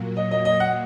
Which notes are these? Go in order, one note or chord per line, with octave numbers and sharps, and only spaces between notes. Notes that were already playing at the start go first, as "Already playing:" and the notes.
Already playing: A#2 F#3 A#3
D#5
D#5
D#5
F#5